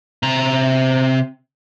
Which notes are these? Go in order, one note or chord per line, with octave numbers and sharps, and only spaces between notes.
C3 A#5